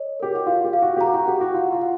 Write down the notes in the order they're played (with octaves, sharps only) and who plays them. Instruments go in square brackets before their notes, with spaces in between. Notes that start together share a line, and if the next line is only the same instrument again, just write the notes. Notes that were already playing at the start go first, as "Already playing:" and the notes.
Already playing: [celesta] C#5 D#5
[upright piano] G4 [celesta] A#4
[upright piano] F#4
[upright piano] F4 [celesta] F5
[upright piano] G4
[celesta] F5
[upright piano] F#4
G4
[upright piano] F#4 [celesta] A#5
[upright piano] F#4
[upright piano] G4 [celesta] F#5
[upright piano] F#4
[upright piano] F4 [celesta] F#5
[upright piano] F4
[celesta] F#5